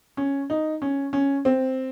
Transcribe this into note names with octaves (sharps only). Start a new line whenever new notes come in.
C#4
D#4
C#4
C#4
C4